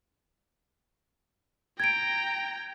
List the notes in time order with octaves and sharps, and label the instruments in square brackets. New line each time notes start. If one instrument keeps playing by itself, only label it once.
[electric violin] G5 A#5 [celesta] G#6 D7